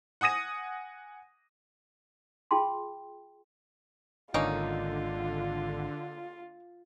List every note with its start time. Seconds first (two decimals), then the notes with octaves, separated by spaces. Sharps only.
0.21 F#5 G#5 D#6 A#6 D#7
2.51 F4 G#4 G5 A5 C6
4.34 G#1 D3 A#3 C#4 D#4 F4